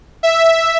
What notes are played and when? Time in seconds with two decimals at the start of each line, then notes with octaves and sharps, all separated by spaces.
0.23 E5